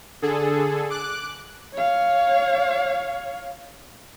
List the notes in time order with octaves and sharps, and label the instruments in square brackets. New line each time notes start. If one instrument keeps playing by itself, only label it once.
[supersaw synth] D3 G#4 A4
D6 F#6
[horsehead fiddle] C#5 F5